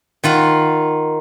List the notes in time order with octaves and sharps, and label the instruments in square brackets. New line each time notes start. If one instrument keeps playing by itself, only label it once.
[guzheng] D#3 F4 F#5